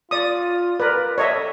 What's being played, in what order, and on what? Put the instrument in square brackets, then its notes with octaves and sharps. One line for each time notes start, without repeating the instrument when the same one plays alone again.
[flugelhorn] F4 [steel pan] D5 D#6
[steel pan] A#4 B4 [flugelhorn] D5
[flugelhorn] A4 [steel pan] C#5 D#5 E5